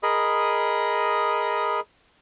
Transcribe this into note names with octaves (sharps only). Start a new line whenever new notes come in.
G#4 A#4 D#5 B5